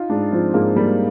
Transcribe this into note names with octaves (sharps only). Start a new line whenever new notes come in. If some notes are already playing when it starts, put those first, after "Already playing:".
Already playing: D#4 F4
G#2 D4
F3 C4
G#2 A#3
G3 A#3